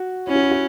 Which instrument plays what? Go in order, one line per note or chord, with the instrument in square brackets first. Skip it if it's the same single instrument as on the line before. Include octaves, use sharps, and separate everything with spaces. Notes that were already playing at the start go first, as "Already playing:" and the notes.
Already playing: [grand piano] F#4
[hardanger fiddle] C#4 [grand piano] E4
[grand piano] F#4
E4
F#4